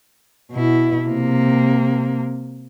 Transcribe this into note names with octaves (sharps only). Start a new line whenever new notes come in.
B2 E4
C3 A#3